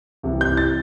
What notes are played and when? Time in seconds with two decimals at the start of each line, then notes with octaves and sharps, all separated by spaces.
0.23 C2 C3 E3 G3
0.41 G6
0.57 A6